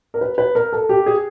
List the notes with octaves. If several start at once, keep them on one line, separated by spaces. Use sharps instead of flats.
A#4
B4
B4
A#4
A4
G4
G#4